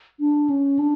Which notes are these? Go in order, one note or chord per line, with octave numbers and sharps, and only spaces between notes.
D4
C#4
D4